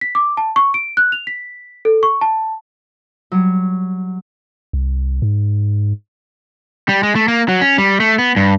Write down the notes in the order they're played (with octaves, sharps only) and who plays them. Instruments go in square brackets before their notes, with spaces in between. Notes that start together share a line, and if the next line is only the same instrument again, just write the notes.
[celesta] B6
D6
A5
C#6
D7
F#6
F7
B6
A4
C#6
A5
[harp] F#3 G3
[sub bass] C2
G#2
[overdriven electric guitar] G3
G#3
A3
A#3
F#3
C#4
G3
A3
B3
G2